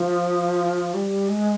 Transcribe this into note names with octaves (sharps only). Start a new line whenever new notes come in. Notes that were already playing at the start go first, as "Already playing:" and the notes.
Already playing: F3
G3
G#3